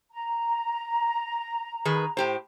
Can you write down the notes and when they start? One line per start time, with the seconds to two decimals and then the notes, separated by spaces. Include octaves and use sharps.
0.11 A#5
1.85 D#3 G#4 B4
2.17 A2 G4 C5